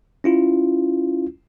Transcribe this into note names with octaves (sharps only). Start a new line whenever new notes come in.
C#4 E4 F4